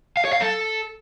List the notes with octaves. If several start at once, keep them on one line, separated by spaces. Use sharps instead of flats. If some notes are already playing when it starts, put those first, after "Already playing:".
F5
C#5
F5
A4